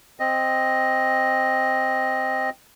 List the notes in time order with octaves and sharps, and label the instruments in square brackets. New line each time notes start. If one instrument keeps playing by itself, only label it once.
[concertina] C4 D#5